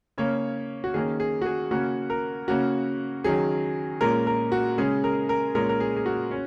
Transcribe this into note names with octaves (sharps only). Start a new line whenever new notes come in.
C#3 A#3 C#4 C#5
F#4
D#3 A#3 C#4 G#4
G#4
F#4
G#4
C#3 A#3 C#4 F#4
A#4
C#3 A#3 C#4 F#4
D#3 F#3 C#4 G#4
A#2 G#3 C#4 A#4
A#4
F#4
C#3 G#3 C#4 G#4
A#4
A#4
A#2 G#3 C#4 A#4
A#4
G#4
G#4
F#4
C#4